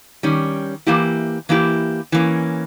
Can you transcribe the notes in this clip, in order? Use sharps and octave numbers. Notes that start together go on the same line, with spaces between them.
D#3 G3 C#4
E3 A#3 E4 G4
E3 A#3 E4 G4
E3 A#3 C#4